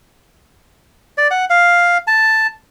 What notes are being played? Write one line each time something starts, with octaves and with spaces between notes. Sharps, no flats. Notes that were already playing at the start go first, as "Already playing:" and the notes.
D5
F#5
F5
A5